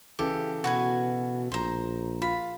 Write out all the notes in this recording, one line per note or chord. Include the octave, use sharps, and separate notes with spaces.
C#3 E3 G4 A4
B2 F#4 B4 G#5
A#1 C5 A#5
F4 B5